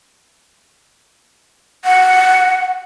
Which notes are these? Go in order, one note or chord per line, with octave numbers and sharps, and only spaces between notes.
F#5